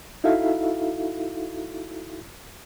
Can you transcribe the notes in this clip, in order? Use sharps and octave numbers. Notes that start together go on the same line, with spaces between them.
D#4 E4 F#4 A4 E5 F5